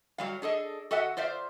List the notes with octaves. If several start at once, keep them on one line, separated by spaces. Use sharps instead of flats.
F#3 G3 F5
D4 G#4 A4 D#5
F#4 A4 D#5 E5 F#5
F4 C5 D5 E5 F5